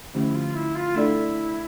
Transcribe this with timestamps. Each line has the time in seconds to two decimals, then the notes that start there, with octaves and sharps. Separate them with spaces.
0.14 D3 F3 A3 C#4 E4 G4
0.34 F4
0.54 E4
0.75 F4
0.95 A3 D4 E4 A4 D5